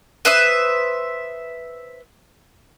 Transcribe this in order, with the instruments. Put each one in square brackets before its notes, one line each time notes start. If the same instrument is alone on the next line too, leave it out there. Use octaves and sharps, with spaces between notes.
[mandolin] B4 C5 E5 D#6